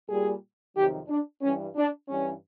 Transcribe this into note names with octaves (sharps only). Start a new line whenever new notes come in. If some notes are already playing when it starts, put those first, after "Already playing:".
A#2 G3 G#4
F2 C3 D#3 F#3 G4
D4
G2 E3 G3 C#4
D4
G2 E3 G3 C#4